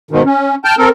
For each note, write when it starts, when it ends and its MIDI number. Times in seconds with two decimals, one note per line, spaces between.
0.11 0.23 44
0.11 0.23 47
0.11 0.23 51
0.25 0.55 61
0.65 0.75 79
0.65 0.75 81
0.65 0.75 89
0.65 0.75 91
0.78 0.89 60
0.78 0.89 69
0.78 0.89 70